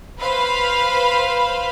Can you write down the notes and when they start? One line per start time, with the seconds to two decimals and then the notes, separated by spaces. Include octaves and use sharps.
0.19 B4 C5 F5 B5